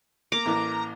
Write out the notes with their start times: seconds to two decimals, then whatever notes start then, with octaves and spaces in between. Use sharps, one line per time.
0.32 A#3 A#5 D6
0.45 A1 E3 A#3